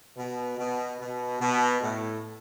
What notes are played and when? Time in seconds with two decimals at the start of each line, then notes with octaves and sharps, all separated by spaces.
0.17 B2
0.58 B2
0.99 B2
1.40 B2
1.82 A2